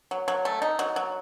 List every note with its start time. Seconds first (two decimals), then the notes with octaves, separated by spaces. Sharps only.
0.11 F#3
0.28 F#3
0.45 A3
0.62 D#4
0.79 F#3
0.96 F#3